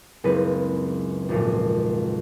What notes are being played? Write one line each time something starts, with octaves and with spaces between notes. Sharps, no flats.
F#1 C#2 C4 B4 D#7
G#1 F2 A#2